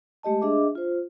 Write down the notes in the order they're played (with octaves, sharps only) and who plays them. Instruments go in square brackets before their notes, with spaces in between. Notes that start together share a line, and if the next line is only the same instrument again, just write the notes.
[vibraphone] G#3 A3 G4 D#5 A5
D4 G#4 D#5 E5 D6
F4 C5